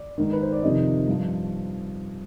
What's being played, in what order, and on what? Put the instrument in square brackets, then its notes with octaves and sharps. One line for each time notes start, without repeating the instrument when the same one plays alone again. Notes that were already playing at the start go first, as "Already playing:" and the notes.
Already playing: [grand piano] D5
G#2 D#3
B4
C5
D5
F2 C3 D#3 D#5
G2 F3